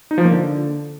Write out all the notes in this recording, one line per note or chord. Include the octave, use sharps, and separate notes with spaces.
D#4
F3
A#3
D3